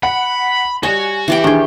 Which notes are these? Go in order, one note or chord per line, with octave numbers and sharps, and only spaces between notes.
F#5 B5
G3 F#4 C#5 D#5 G#5
E3 G4 G5
D#3 D4 G#4